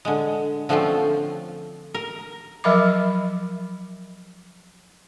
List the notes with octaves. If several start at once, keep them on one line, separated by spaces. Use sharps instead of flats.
D3 G#3
D3 F3 A3 C4 C#4 F4
A#4
F3 F#3 A#4 E5 B5 D6